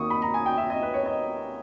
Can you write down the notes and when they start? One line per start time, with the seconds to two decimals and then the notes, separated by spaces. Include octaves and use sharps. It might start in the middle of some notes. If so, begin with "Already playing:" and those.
Already playing: D#2 D#3 A#3 C#6 D#6
0.10 B5
0.22 A#5
0.34 G#5
0.46 G5
0.57 E5
0.70 D#5
0.83 B4
0.94 C#5
1.06 D#5